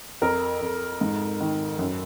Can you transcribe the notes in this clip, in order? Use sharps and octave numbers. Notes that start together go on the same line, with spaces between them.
F2 A#4
F2
G#2
D#3
F#2